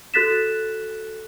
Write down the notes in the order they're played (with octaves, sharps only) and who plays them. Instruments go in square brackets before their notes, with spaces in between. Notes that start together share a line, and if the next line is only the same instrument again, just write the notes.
[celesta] F#4 A4 F#6 A6 B6 E7